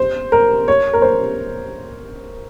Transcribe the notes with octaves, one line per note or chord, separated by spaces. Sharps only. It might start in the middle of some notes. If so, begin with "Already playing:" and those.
Already playing: C5
A#4
C#5
A#4
C5